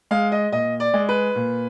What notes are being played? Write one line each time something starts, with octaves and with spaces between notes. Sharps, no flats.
G#3 F5
D#5
A#2 D#5
D5
G#3
B4
A#2